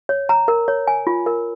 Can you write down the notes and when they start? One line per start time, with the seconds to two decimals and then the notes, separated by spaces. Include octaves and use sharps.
0.09 C#5
0.29 A#5
0.48 A#4
0.68 C#5
0.87 G#5
1.07 F4
1.26 A#4